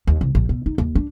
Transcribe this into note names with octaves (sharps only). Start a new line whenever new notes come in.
D#2
C2
A#1
B2
D#4
D#2
D4